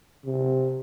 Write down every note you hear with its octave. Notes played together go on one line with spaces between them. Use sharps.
C3